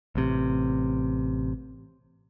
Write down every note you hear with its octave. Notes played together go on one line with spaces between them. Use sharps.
A1 C3